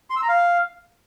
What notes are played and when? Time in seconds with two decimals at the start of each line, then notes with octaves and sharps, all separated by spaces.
0.10 C6
0.16 E6
0.22 A#5
0.28 F5